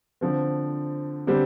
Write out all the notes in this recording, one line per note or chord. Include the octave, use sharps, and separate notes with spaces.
D3 F3 C4
D3 G3 C4 G4